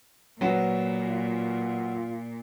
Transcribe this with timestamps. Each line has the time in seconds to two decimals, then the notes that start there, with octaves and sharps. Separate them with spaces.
0.41 A#2 F#3 B3 F#4
1.08 F4